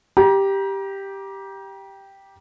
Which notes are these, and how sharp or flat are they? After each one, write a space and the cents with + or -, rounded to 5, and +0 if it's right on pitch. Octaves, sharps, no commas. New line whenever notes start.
G4 +0 A#5 +35